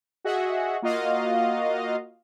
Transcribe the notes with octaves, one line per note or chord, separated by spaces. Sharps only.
F#4 G#4 D#5 E5 F#5
A#3 F4 F#4 D#5 F5